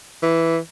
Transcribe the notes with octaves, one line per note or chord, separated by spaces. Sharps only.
E3